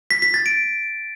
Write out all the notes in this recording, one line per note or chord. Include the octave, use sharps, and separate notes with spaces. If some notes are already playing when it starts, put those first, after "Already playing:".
B6
B6
A6
D7